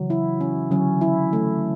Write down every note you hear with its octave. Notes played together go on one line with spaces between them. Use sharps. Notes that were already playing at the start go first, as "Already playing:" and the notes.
Already playing: C#3 E3 F#3
E4
C#4
D3 F#3 C#4
E4
A3